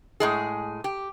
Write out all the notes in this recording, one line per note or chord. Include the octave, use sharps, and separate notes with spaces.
A2 G#3 G#4
G4